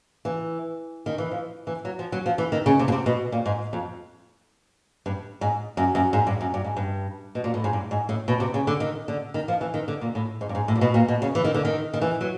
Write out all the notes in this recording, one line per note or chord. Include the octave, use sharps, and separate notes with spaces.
E3
D#3
E3
F3
E3
F#3
F3
F#3
F3
E3
D#3
C#3
C3
B2
C3
B2
A#2
G#2
F2
G2
G#2
F#2
F#2
G#2
G2
F#2
G2
G#2
G2
B2
A#2
A2
G#2
G2
G#2
A2
B2
C3
C#3
D3
D#3
D3
D#3
F3
E3
D#3
D3
A#2
A2
G#2
G2
G#2
A2
A#2
B2
A#2
B2
C#3
E3
D#3
D3
D#3
D#3
E3
F#3